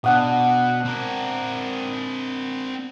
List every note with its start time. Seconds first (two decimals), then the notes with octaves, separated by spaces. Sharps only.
0.04 B2 D4 F#5 D#6
0.85 C4 A#4